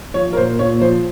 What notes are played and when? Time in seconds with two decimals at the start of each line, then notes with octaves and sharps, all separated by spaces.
0.14 F3 C#5
0.33 A#4
0.37 A#2 C5
0.59 A#2 C#5
0.82 F3 C5